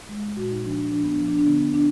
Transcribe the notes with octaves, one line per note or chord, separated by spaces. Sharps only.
G#3
A#2 F#4
D#4
F3 D4
D4
F3 D4
B3
D4
F3
D4
D4
D3 B3
B3
D4